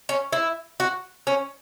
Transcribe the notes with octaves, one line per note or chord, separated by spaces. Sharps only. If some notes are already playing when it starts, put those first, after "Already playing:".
C#4
E4
F#4
C#4